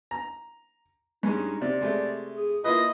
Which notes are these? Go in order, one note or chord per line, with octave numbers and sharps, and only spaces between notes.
A#5
G2 G#3 C#4 D#4
C3 D5
C3 G#3 A3
G#4
A#3 E4 F4 B4 D#5